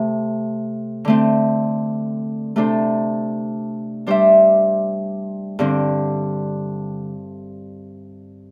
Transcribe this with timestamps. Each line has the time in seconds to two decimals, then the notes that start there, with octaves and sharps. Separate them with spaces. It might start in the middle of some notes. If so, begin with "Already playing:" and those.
Already playing: C3 A3
1.05 D3 A3 C4
2.56 C3 A3 D4 A4 C5
4.07 G3 D4 G4 C5 E5
5.59 G2 D3 C4